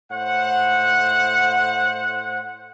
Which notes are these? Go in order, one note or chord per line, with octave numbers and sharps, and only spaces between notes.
A2 C5 F#5